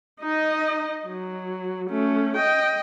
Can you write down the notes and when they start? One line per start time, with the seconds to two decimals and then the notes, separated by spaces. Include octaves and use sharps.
0.20 D#4 D#5
1.08 F#3
1.90 A3 C#4
2.36 D#5 G5